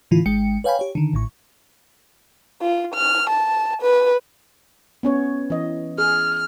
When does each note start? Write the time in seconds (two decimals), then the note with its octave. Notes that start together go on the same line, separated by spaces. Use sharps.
0.11 A2 D3 E3 E4 F4
0.26 G#1 G#3 G5 C#7
0.64 B4 C#5 F5 G5 G#5 B5
0.79 G4 C#5
0.95 D3 D#3
1.13 A1 A2 C#6
2.61 F4
2.94 F6
3.29 A5
3.82 B4
5.03 B3 C#4 C#5
5.50 E3 D#5
5.98 G#4 F6